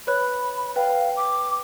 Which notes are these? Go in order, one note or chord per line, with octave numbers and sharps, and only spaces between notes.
B4 C#5 B5 F#6
B4 F5 G5
D6